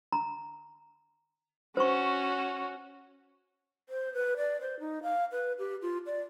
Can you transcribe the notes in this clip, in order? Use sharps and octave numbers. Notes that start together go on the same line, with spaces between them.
A#5
C#4 F#4 C5 C#6
C5
B4
D5
C5
D#4
F5
B4
G4
F4
D5